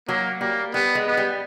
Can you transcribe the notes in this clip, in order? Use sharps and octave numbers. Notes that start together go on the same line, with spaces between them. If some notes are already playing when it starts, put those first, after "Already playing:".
F#3 A#3
G3 A#3
G3 B3
G#3
B3
G3